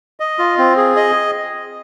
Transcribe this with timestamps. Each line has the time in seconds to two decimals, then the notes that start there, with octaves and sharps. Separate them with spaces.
0.20 D#5
0.39 F4
0.58 C4
0.77 G#4
0.96 D#5